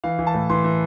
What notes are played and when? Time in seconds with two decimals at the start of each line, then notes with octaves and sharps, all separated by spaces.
0.04 E3 F5
0.19 E3
0.27 A5
0.34 A2
0.50 E3 C6
0.64 E3